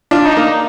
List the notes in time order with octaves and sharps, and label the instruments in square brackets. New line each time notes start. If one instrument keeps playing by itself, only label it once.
[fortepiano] D4 F4
[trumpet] D#4
[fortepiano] A#3